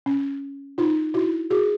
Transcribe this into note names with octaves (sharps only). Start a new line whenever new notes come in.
C#4
D#4 F4
E4 F#4
F#4 G#4